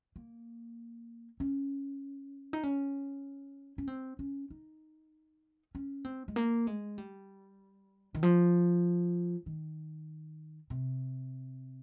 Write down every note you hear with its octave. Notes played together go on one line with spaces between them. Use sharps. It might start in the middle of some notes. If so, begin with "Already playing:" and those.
A#3
C#4
D#4
C#4
C#4
C4
C#4
D#4
C#4
C4
G#3
A#3
G#3
G3
D#3
F3
D#3
C3